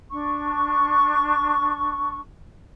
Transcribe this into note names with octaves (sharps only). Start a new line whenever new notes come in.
D4 C#6